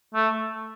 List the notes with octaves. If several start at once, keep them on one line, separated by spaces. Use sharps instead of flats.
A3